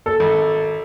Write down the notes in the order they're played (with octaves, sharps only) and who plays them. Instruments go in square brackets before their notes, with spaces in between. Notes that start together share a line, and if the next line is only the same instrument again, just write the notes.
[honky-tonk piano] A4
[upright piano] G#1